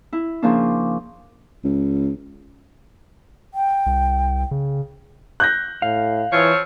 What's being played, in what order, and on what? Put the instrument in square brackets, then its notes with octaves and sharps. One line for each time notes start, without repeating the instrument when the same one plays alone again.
[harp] E4
C#3 F3 A#3 D4
[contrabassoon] C#2
[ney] G5
[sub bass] C2
C#3
[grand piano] F#6 G6 A#6
[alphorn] A2 [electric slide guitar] F5
[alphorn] E3 [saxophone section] F3 C4 C#5